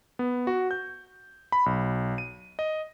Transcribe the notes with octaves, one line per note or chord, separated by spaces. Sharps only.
B3
F#4
G6
B5
B1
D#7
D#5